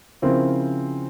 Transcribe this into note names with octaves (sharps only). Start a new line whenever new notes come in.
C#3 F3 C4 E4 A#4